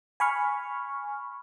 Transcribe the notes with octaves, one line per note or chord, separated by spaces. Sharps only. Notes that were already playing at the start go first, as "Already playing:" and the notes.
G#5 B5 C#6 F6